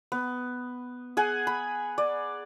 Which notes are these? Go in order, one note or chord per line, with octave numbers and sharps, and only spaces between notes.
B3
G#4 F#5 G#5
B5
D5